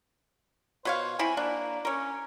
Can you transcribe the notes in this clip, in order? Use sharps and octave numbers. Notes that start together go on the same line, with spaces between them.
B2 C5 C#5 F5
C4 E4 G#5 B5
A#3 D4
C#4 A#4 C#5